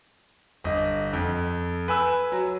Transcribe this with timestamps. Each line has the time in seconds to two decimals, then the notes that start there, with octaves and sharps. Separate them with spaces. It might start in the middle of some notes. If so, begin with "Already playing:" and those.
0.64 G1 D#5
1.13 F2
1.88 B4 G#5 E6
2.32 F#3